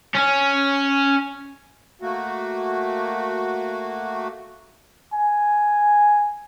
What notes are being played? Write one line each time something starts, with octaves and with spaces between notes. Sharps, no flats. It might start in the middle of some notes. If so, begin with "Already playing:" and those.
C#4
A3 A#3 F#4
G#5